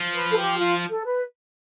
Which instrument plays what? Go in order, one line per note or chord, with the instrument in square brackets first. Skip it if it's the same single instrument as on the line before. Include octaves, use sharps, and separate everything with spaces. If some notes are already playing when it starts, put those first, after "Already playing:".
Already playing: [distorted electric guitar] F3
[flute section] B4
A4
G4
F4
A4
B4